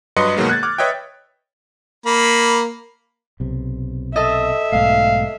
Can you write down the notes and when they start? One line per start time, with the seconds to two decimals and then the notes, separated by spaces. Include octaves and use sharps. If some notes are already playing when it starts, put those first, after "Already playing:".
0.16 G2 F#3 B4 D#5 C6 C#7
0.37 B2 D#3 F#3 G#3 A#3
0.49 F#6 G#6 A6
0.63 D6 F6
0.78 B4 C#5 D#5 E5 G5
2.06 A#3 B5
3.40 B1 C3
4.16 A4 D#5 E5
4.72 B1 G#2 A3 F5